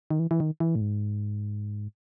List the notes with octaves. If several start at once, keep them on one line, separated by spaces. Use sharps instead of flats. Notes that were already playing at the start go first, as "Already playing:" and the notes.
D#3
E3
E3
D#3
E3
A2
G#2